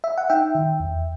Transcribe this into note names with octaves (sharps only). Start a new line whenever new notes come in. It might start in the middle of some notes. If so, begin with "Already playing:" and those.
E5
F#5
D#4 E5 G5
D#3
E2